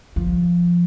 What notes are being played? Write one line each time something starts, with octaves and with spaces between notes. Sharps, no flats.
F3